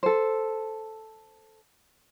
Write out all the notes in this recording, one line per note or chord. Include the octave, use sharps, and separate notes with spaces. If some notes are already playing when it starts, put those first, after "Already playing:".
A4 C5